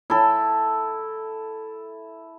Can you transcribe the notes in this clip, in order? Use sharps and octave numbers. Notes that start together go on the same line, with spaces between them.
E4 A4